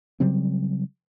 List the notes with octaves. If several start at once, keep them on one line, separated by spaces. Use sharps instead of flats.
C#3 F#3 G3 C4